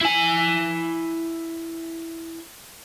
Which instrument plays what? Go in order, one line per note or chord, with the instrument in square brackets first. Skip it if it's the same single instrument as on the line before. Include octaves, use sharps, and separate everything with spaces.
[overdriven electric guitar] E4 G#5